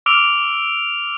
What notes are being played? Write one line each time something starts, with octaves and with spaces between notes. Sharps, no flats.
D6 E6 F6 D7 F7